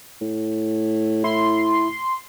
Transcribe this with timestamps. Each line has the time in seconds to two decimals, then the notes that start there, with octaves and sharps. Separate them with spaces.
0.21 A2
1.24 E4 C6